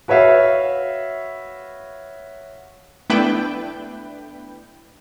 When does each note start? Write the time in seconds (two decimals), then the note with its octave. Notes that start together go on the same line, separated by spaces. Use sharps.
0.08 F#4 B4 C#5 E5 F5
3.10 A3 B3 D4 E4 B4 G5